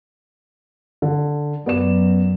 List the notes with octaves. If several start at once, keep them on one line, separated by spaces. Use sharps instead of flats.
D3
F#2 B3 D5 E7